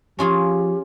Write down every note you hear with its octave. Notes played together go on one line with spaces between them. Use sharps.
F3 C#4 F4 G4 G#4